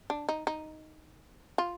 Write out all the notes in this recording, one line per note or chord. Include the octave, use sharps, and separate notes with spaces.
D4
D#4
D#4
F4